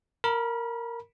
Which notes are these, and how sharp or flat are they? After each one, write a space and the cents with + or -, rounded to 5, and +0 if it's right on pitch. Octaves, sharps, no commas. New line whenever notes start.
A#4 -5 B5 -35